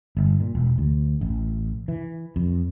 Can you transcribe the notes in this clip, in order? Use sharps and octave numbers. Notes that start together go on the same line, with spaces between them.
G1
A#2
E1
D2
A1
E3
F2